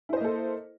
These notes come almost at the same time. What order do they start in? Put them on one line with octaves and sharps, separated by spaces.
E4 C5 D#5 A#3 A4